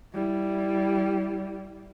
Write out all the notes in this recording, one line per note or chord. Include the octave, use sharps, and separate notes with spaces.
G3 E4